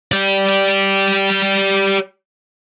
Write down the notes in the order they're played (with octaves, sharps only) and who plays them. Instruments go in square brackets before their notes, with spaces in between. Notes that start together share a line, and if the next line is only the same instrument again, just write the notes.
[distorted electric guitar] G4 D5